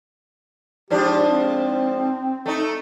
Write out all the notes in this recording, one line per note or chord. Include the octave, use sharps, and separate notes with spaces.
G#2 F3 D4 G4
C4
A3 D#4